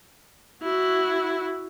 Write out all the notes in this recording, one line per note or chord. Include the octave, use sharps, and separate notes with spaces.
E4 F#4